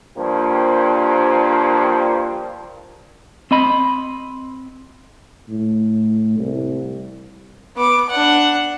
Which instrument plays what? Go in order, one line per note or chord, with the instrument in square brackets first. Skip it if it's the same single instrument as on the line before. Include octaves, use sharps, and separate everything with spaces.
[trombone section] G2 F3 A#3 D4 G4 C5
[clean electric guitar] C4 D#5 B5
[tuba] A2
C2
[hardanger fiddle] B3 D6
D4 F#5